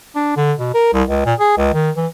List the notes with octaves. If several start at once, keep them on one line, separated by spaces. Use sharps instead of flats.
D4
D3
B2
A#4
C2
C#2
A#2
G#4
C#2
D#3
E3